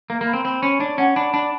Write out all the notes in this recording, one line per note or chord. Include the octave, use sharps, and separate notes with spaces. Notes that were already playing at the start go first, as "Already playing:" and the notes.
A#3 A#4
A#3
B5
C4
C4 B5
C#4 B5
D4 C#5
C#4 F#5
D4 B5
D4 B5